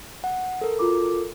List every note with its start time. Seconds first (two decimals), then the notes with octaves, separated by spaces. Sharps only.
0.24 F#5
0.61 A4 A#4
0.79 F4 F#4 D6